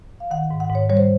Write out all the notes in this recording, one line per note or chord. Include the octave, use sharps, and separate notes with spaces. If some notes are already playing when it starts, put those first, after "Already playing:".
F5
D#3 F#5
G#2
F#5
G#2 C#5
G3 C#5
C5